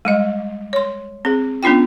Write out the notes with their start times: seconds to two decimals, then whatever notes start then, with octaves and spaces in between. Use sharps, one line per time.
0.05 G3 G#3 D#5
0.73 C#5 C6
1.25 C4 G#4
1.63 B3 C#4 D4 F4 G5